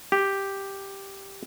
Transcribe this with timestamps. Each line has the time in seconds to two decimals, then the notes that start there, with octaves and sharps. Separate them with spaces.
0.12 G4